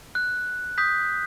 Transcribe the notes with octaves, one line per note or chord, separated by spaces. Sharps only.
F#6
D#6 G6 B6